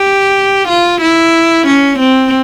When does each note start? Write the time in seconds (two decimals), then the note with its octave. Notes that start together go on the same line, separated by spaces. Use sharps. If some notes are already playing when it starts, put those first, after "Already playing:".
Already playing: G4
0.68 F4
1.01 E4
1.67 C#4
1.99 C4